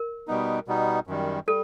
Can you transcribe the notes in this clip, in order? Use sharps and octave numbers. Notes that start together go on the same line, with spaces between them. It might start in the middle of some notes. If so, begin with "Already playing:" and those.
Already playing: A#4
B2 G3 B3 D#4
B2 G3 B3 D#4
F#2 D#3 G3
G3 A4